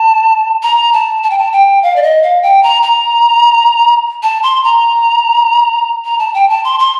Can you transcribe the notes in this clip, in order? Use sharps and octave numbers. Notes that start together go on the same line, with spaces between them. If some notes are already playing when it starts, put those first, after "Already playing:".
Already playing: A5
A#5
A5
A5
G5
A5
G5
F5
D5
D#5
F5
G5
A#5
A#5
A5
C6
A#5
A#5
A5
G5
A5
C6
C6